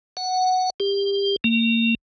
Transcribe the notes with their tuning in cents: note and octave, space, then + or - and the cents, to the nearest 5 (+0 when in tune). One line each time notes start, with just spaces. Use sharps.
F#5 +0
G4 +25
A#3 -30